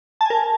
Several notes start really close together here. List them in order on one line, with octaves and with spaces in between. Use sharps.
A5 G#5 A#4